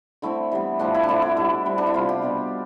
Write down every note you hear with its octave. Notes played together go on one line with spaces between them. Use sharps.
D3 A3 C4 E4
E3 G3 B3
A2 F3 A3 C4 D4
E4
D4
D3 A3 C4 E4
E4
B2 G3 B3 E4
D3 G3 C4
D4
E4
C3 G3 B3 F4
G4
B2 G3 B3